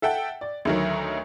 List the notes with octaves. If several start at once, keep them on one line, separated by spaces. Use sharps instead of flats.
A4 E5 F#5 G5
D5
D2 D#3 F#3